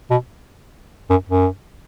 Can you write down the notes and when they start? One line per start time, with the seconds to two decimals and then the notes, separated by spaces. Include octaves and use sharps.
0.11 B2
1.10 F#2
1.29 F#2